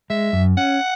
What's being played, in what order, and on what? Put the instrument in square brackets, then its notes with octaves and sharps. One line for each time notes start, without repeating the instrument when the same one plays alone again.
[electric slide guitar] G#3 [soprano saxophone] E5
[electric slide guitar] F#2
[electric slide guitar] C#4 [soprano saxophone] F#5